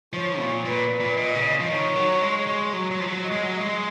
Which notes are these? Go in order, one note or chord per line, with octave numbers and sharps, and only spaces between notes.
F3 C#5
A#2
A#2 B4
A#2
A#2 D#5
C#3
F3
D#3 C#5
F#3
G#3
G#3
F#3
F#3
F3
F#3
D#5
G#3
F#3
G#3